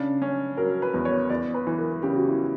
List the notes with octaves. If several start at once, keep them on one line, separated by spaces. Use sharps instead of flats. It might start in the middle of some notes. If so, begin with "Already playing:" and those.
Already playing: C#3 D4
C#4
F#3 A#4
B4
E2
C#5
E2 D5
B4
E3
A#4
C#3 G4
F#4
E4